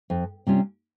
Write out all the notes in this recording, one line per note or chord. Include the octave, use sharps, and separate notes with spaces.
F2
C3 G3 C#4 F4